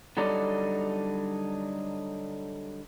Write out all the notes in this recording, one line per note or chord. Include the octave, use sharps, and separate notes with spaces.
D3 F#3 G3 D#4 A4 D5